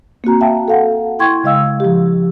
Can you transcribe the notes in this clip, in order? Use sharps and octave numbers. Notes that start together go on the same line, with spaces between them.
A#3 C4 F#4 A#5
E5 F5 G5 A5
A4 F5 F#5
E4 G5 C6 C#6 G#6
C#3 G#3 D#5 F5 E6
F3 G4